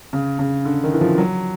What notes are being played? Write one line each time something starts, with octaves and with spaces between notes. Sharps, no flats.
C#3
C#3
D3
D#3
E3
F3
F#3